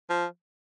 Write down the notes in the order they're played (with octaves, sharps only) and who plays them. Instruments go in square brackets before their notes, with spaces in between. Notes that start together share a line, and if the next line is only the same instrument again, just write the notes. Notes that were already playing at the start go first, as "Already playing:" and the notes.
[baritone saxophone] F3